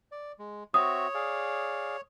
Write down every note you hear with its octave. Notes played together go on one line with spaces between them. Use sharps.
D5
G#3
C4 F#4 C#5 E5 D#6
G#4 D5 F5